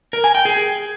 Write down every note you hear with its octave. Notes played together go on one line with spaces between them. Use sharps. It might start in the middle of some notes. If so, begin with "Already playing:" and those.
A#4
G#5
G5
G#4